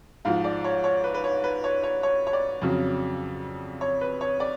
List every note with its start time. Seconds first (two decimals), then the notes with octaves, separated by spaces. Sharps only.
0.25 G#2 F3 F5
0.44 D5
0.64 C#5
0.84 C#5
1.04 B4
1.14 B4
1.24 C#5
1.44 B4
1.64 C#5
1.83 C#5
2.03 C#5
2.27 C#5
2.33 D5
2.62 F2 C#3 F#3
3.81 C#5
4.01 B4
4.21 C#5
4.40 D5